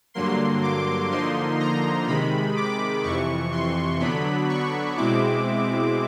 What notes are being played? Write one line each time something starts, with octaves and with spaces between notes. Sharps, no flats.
G2 D3 F#3 A#3 C6
D6
D3 F3 A#3 D#4 C6
A#5
C3 D#3 G#3 B5
D6
F2 C3 E3 C#6
C6
D3 F#3 B3 D4 B5
C#6
B2 G#3 C4 E4 D6